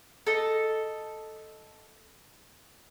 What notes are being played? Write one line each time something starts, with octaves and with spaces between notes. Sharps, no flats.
A4 D#5